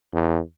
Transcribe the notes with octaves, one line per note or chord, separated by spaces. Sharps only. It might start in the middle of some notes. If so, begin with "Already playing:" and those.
E2